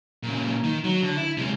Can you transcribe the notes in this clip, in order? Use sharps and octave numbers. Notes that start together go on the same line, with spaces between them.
A#2 C#3
D#3
F#3
D3
E4
C3 G#3